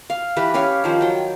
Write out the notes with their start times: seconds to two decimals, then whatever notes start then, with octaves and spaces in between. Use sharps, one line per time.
0.10 F5
0.36 E3 G4 B4
0.54 C#4 G4 C#5 F5
0.84 D#3 F3 C5
1.01 F#3 G5